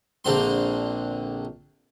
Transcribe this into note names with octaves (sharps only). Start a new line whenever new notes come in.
A#1 D3 C4 C6